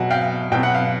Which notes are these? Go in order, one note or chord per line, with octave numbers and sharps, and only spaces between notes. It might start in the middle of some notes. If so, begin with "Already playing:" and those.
Already playing: B2 F#3 F#5 G#5
F5 G5
B2 F#3 G5
F#5
F5